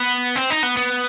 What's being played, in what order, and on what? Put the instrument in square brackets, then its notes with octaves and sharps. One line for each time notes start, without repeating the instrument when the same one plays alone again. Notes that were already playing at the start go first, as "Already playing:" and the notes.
Already playing: [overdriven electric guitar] B3
C4
D#4
B3
B3